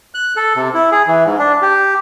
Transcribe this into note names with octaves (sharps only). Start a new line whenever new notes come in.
F#6
A4
C3
E4
G#4
E3
G#2
D4
G4